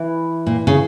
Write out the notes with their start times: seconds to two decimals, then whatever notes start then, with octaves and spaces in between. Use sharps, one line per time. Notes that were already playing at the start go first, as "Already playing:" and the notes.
Already playing: E3 E4
0.47 A#2
0.67 C#3